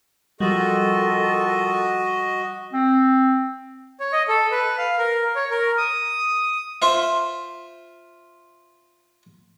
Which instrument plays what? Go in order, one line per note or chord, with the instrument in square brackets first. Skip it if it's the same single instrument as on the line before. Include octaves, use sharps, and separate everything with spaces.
[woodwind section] D#3 F4 A4 [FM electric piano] F3 G3 [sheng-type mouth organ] F#4 D#5
[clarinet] C4
[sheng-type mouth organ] C#5
D#5
A4
B4
F5
A#4
C#5
A#4
D#6
[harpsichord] F4 C5 E5